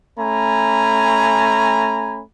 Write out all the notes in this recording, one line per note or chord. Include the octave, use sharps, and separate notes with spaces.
A3 C#4 G#5 A#5 B5